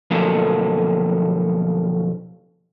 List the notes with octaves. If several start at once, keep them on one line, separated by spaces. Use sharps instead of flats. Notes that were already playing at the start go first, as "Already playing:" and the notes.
B1 F2 D3 F3 A3 A#3